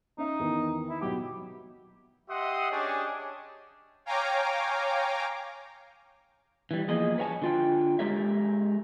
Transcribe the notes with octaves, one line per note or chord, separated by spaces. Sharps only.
C#4 D#4 E5
E2 D#3 E3
E4
B2 F#3 G4 D6
G4 D#5 E5 F#5 C6 D#6
C#4 D4 G4 G#4 C#5 D#5
C#5 F5 G5 G#5 A#5 D6
E3 G3
E2 F3 A#3 G#4 D#5
B4 C#5 F5 G#5 A5
D3 F4 G5
G#3 G4 A4 A#4 C#5 E5